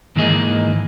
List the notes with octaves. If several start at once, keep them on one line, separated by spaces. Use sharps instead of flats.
G#2 D#3 E3 A#3 G#4 D#5